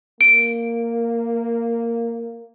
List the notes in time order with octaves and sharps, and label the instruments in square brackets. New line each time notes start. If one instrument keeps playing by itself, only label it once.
[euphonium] A#3 [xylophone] D7